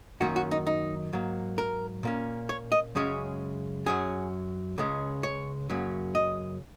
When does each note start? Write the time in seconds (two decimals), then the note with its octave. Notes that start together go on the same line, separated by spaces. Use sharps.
0.20 F#2 D#3 F#3 A#3 C#4 F#4
0.36 F#4
0.51 D#4
0.67 D#4
1.13 G#2 F#3 A#3
1.58 A#4
2.03 A#2 A#3 C#4
2.49 C#5
2.72 D#5
2.95 F#2 C#3 G#3 C#4 C#5
3.86 F#2 F#3 C#4 G#4
4.78 C#2 C#3 G#3 C#4
5.23 C#5
5.70 F#2 C#3 F#3 A#3 C#4
6.15 D#5